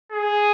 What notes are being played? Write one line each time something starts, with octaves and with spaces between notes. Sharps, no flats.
G#4